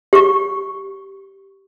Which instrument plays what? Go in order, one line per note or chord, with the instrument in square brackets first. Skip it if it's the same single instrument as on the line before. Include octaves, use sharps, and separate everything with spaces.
[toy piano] G4 C#6